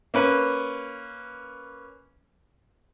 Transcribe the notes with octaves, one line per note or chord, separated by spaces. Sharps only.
A#3 C#4 B4